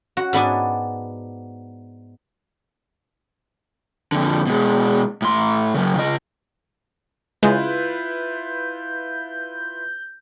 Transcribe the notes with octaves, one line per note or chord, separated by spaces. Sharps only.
F#4
G#2 B3 D4 G#5
F2 D3
B2 G#3
A2 C6
C#3 F#3
C#3 D#5
C#3 G#3 E4 F4 B4 G6